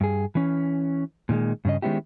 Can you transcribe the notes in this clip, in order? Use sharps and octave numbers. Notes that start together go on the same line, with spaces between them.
G2 G#4
E3 C#4
A#2 D#3 F#3 G#3
G2 C#3 D#5
D#3 G#3 B3 C#4 E4 G4